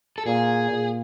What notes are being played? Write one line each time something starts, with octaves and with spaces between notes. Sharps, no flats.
A4
A#2 G#4
A#2